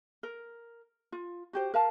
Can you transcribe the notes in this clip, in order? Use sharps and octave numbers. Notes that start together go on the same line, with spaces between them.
A#4
F4
F#4 G4 C5
A#4 F5 A5